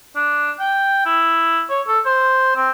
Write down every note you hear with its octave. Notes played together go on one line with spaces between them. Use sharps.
D4
G5
E4
C#5
A4
C5
C4